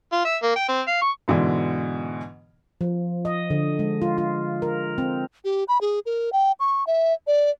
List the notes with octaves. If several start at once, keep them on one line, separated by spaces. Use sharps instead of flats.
F4
E5
A#3
G5
C4
F5
C#6
G#2 B2 D3 E3
F3
D#5
D3
G#3
F4
F4
A#4
C4
G4
B5
G#4
A#4
G5
C#6
E5
D5